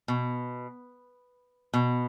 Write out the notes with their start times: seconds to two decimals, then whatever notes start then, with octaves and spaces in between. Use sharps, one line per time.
0.08 B2
1.74 B2